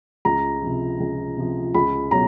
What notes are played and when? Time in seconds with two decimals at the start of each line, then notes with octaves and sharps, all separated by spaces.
0.25 C#2 A#5
0.62 C3 F3
1.00 C#2
1.37 C3 F3
1.74 C#2 B5
2.11 B2 F#3 A#5